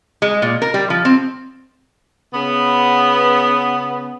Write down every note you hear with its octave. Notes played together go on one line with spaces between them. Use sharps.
G#3
A#2
A#4
G3
F3
C4
C#3 B3